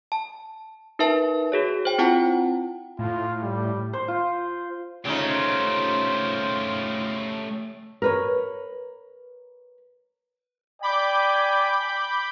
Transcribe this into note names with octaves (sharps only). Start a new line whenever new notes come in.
A5
D#4 A#4 B4 E5 A5
F#4 G#4 C#5
C5 G5
C4 E4 F4 F#5 G5 A5
A2 F4
G3
C5
F4
C#3 A3 D#4 F4 G4 C5
A#4 B4 C#5
D5 G5 G#5 B5 D6 G6